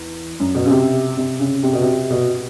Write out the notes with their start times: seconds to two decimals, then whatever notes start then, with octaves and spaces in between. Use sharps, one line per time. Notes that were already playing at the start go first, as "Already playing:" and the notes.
Already playing: E2
0.40 F#2
0.55 B2
0.66 C#3
0.70 C3
1.17 C3
1.40 C#3
1.63 C3
1.73 B2
1.82 C3
2.10 B2